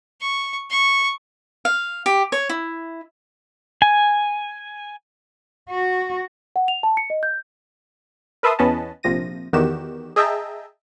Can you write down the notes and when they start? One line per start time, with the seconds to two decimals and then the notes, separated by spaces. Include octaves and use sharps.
0.21 C#6
0.70 C#6
1.65 F5
2.06 G4
2.32 C#5
2.49 E4
3.82 G#5
5.70 F#4
6.56 F#5
6.68 F7
6.83 A5
6.97 C#7
7.10 D#5
7.23 G6
8.43 A#4 B4 E5 A5 C6 D#6
8.59 E2 B3 C#4 B4 D#5 A5
9.03 A#1 C3 F3 A#6 D#7
9.53 E2 D#3 F#4 G4 E7
10.16 G#4 D#5 E5 G5 A5 A#5